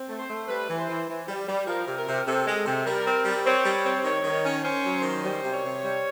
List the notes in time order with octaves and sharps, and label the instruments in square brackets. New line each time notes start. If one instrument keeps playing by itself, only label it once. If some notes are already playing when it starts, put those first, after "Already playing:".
Already playing: [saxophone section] C4
A3
[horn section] C5
[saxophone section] A3
[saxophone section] G3 [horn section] B4
[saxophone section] E3
[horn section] C5
[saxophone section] E3
E3
G3
G3
[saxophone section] F3 [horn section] A#4
[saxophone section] C3
[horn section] A#4
[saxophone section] C3
[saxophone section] C3 [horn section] A4
[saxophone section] G#3
C3
[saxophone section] G3 [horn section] A#4
[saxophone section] C4
G3
[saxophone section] C4 [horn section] C#5
[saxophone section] G3
C4
[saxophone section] D#3 [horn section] C#5
[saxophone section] D#3
C#4
[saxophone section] C#4 [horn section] C5
[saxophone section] F#3
D#3
[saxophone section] G3 [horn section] C5
[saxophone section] C3
[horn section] C#5
[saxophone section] C3
G3